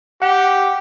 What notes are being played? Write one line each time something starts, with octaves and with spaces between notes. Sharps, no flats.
G4 F#5